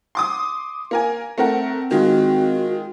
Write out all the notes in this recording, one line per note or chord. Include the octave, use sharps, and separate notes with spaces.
C6 D6 D#6
A#3 A#4 G#5
A3 C4 A#4 F#5
D#3 G#3 F4 F#4